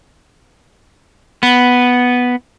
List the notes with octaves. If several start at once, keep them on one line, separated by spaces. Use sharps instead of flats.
B3